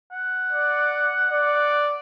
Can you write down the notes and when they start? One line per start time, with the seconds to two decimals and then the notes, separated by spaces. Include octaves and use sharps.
0.12 F#5
0.53 D5
1.31 D5